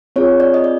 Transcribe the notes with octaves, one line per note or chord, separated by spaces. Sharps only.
C4 F4 G#4 C#5
D5
D#5
D5